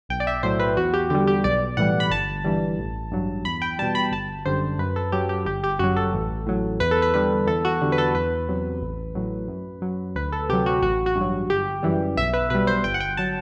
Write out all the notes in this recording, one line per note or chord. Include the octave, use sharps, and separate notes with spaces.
B1 G5
D5
E5
A2 F#3 C5
B4
E2 F#4
G4
D3 G3 G4
G4
B1 D5
A2 E3 G3 F#5
B5
G1 A5
G2 E3 G3
A1
G2 F#3
E2 B5
G5
B2 G3 A5
B5
G1 A5
F#2 D3 G3 C5
F#2 B4
A4
F#3 G4
G4
G1 G4
G4
F#2 F#3 F#4
A4
A1
A2 F#3
E2 B4
A4
B4
D3 G3 B4
E2 A4
F#4
D3 G3
B4
A4
E2 B4
C3 F#3
A1
A2 F#3
F#2
F#3
D2 B4
A4
C3 F#3 G4
F#4
A1 F#4
F#4
G2
F#3
G1 G4
F#2 E3 G3
B1 E5
B4
B2 G3 B4
C5
G1 G5
F#5
G5
F#3 A5